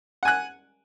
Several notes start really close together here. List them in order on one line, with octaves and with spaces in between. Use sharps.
F#5 G#5 F#6